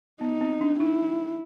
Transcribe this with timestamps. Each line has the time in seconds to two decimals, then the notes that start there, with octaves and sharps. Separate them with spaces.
0.21 B3 D#4
0.41 C4
0.61 D4
0.80 D#4 E4